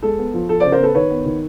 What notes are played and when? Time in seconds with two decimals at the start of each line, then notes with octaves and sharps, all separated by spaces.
0.03 G#3 A4
0.18 B3
0.34 F3
0.49 F3 A4
0.60 C5 D5
0.64 C#3
0.72 A#4 C5
0.80 B3 A4 B4
0.95 D#3 B4 C#5
1.11 B3
1.26 D#3